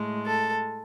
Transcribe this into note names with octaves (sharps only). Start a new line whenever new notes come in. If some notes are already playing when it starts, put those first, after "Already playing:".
Already playing: A2 G#3
A4